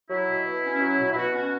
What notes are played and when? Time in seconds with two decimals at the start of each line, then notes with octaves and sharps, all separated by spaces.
0.10 F#3 E4
0.28 B2
0.46 B2
0.63 C#4
0.80 F#3
0.98 B2
1.11 E4
1.16 B2 F#4
1.33 C#4 F#4